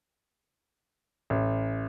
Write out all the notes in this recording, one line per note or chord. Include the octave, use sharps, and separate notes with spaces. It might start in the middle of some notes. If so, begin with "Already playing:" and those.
A1